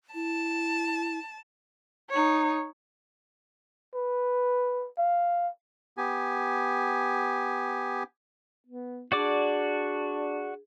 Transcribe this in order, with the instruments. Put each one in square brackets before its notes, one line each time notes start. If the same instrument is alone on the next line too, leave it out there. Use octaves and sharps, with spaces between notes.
[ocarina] E4 [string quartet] A5
[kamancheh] D#4 C#5
[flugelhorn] B4
F5
[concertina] B3 G4 G#5
[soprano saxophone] B3
[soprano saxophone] D4 [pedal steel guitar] F#4 D5 D6 [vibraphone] G#4